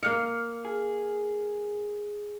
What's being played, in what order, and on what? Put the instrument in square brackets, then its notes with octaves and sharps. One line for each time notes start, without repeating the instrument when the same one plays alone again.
[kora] A#3 F5 [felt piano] F6 C#7
[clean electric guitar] G#4